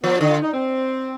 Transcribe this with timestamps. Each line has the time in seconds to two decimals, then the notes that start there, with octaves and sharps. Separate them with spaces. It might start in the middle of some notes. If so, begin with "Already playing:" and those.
0.03 F3 B3
0.16 D4
0.21 D3 D#4
0.29 F4
0.41 D#4
0.54 C4